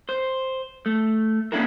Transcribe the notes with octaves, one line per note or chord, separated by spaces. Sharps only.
C5
A3
A#3 C#4 D4 E4 A4 A#4